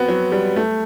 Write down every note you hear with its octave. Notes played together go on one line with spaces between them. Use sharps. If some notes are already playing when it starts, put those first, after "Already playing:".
Already playing: B3 C4 F#4
F#3
G3
A3